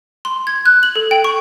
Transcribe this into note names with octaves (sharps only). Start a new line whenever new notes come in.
C6
G#6
F#6
F#7
A4
G5
C#6